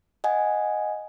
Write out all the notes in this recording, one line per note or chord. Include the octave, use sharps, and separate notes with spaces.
D#5 F#5 G#5